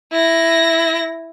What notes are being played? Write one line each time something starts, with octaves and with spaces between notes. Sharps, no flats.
E4 A#6